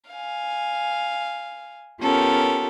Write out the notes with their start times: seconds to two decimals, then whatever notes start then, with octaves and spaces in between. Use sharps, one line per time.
0.11 F5 G#5
2.01 B3 C#4 F4 G4 A4 A#4